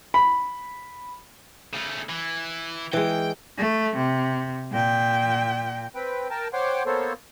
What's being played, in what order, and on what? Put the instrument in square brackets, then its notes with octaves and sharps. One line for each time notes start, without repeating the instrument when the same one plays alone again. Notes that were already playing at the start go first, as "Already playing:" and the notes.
[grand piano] B5
[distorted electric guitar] C#3 A3
E3
[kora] E3 G#3 [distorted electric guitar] G5
[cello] A3
C3
A#2 G5
[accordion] C4 B4 G5
A#4 G5 A5
C5 C#5 F#5 G5 C6 D6
A#3 B3 A4 C5 C#5